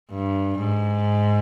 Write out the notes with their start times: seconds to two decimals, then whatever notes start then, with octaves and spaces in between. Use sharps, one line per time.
0.12 G2
0.58 G#2